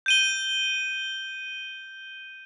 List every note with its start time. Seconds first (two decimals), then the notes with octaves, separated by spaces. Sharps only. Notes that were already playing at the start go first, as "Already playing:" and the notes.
0.06 G6 D#7 G7